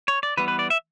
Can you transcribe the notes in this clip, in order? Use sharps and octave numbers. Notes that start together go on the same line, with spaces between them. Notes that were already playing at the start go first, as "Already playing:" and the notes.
C#5
D5
E3 G3 B3 B4
B4
D5
E5